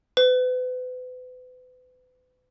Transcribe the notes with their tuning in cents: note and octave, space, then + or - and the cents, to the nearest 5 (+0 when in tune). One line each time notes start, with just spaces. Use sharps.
B4 +35